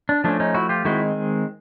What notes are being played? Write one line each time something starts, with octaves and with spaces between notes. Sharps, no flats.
D4
F3 A3 C#4 D4
C#4 D#4
E4 F#4
F4 G4
D#3 G#3 C4 E4 F#4